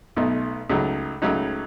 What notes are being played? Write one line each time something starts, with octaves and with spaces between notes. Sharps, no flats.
B1 B2 A3 D#4
C#2 C#3 F#3 A3 D#4
C#2 C#3 F#3 A3 D#4